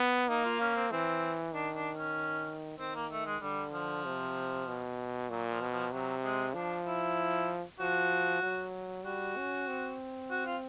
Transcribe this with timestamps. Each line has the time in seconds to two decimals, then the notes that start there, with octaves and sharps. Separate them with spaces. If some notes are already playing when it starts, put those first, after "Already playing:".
Already playing: B3
0.29 A#3 D#4
0.45 F4
0.60 C#4
0.76 C4
0.92 E3 C4
1.54 D#3 D4
1.75 D4
1.96 C#4
2.79 D#3 C4
2.95 A#3
3.11 A3
3.26 G#3
3.42 D3 G3
3.73 F3
4.05 C3
4.68 B2
5.30 A#2 F#3
5.51 F3
5.61 B2
5.72 F3
5.92 C3 F#3
6.24 G#3
6.54 F3 D4
6.87 E4
7.80 F3 F#4
8.43 F#3
9.05 G3 F#4
9.37 C#4
9.68 C4
10.31 F#4
10.46 F4